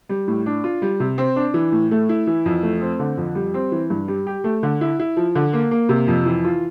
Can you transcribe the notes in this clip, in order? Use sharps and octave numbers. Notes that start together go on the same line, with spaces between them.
G3
A2
D4
F4
G3
C3
C4
D4
E3
A2
A3
E4
E3
F2
A3
C4
D3
F2
G3
C4
E3
G2
G3
G4
A3
D3
E4
E4
F3
D3
A#3
A#3
C3
F2
E3
F4